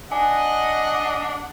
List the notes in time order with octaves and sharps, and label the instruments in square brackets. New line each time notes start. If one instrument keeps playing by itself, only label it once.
[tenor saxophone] D4 [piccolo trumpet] D#5 [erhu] F#5 [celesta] G#5